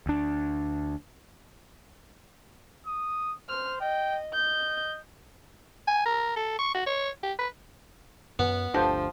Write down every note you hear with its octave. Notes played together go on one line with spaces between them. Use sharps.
D2 D4
D#6
C5 F6
D#5 G5
D#5 G6
G#5
A#4
A4
C#6
F#4
C#5
G4
B4
F#2 B3
G1 D2 F3 C4 D4 G4 A4